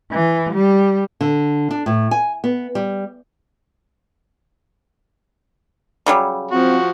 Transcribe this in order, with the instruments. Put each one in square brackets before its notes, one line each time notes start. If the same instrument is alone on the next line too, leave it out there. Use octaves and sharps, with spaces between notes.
[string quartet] E3
G3
[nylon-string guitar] D3
D4
A2
G#5
B3
G3
[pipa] C#3 F#3 G3
[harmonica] F3 F#4 [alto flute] C4